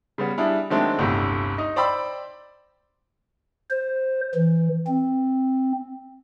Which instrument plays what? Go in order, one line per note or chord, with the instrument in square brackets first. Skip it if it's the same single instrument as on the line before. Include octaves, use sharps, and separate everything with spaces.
[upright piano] C#3 G3 B3
G3 D4 E4 G#4
D#3 F#3 G#3 A3 C4 D4
G1 D2 A2 C3
D#4 D#5
C5 D5 G5 B5 E6
[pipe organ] C5
E3
C4